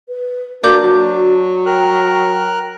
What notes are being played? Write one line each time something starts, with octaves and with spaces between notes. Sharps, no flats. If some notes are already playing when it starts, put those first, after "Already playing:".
B4
A#3 D4 F#4 D5 D6 G6
F#3 F#4
A#4 G5 F6 F#6